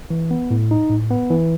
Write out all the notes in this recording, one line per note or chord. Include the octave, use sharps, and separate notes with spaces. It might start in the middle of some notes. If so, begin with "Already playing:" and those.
E3
B3
A2
D#4
A2
B3
E3